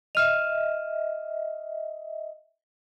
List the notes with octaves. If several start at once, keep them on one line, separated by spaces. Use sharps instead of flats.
D#5 E5 F6 F7